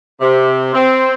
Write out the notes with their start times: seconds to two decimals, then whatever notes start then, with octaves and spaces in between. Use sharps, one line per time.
0.20 C3
0.74 C4